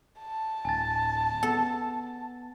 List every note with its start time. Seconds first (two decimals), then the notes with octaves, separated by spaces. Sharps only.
0.19 A5
0.65 D1 G#5 A6
1.43 B3 A4